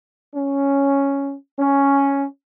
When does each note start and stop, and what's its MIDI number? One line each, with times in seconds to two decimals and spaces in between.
0.34 1.35 61
1.59 2.24 61